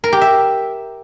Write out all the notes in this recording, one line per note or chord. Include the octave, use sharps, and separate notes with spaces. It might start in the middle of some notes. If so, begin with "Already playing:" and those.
A#4
G4
E5